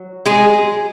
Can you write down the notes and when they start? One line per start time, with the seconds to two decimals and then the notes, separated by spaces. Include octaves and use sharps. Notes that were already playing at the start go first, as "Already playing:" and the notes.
Already playing: F#3
0.26 G#3 G#4